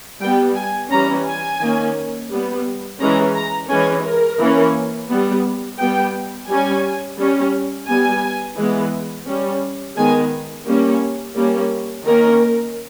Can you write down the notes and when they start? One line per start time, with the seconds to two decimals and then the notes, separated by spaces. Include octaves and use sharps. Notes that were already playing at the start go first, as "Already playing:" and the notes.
0.20 G3 B3 G5
0.55 G#5
0.90 E3 G3 C#4 A#5
1.25 G#5
1.60 D#3 A#3 C#4
2.30 G3 B3
3.00 E3 G#3 C#4 A#5
3.34 A#5
3.69 E3 G#3 C#4 G#5
4.04 A#4
4.39 E3 A#3 C#4
5.08 G3 B3
5.78 G3 B3 G5
6.48 G3 C#4 G#5
7.18 G3 C#4
7.87 G3 B3 G#5
8.57 E3 G#3 B3
9.26 G3 C#4
9.96 D#3 G#3 B3 G#5
10.66 G3 A#3 C#4
11.35 G3 A#3 C#4
12.05 D#3 A#3 C#4 A#4